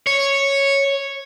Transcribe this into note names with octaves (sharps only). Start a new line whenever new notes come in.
C#5